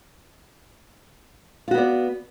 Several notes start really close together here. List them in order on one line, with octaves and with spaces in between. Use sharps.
F4 F#4 B3 D5